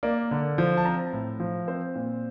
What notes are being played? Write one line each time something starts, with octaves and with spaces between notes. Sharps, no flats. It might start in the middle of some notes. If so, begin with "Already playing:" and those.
A#3 D5
D3
F3
A5
C4 A#5
A2
F3
C4 C5
A#2